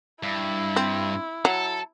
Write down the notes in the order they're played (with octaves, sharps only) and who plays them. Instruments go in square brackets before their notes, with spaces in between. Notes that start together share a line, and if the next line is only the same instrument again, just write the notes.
[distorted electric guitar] G2 [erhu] E4
[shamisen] C4
[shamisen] F#3 [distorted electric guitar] A4